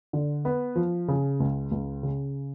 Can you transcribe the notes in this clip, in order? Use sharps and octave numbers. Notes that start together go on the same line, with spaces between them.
D3
B3
F3
C#3
C#2
C#2
C#3